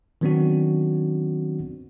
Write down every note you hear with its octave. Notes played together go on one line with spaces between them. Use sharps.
D#3 F#3 B3 C4 D4 F#4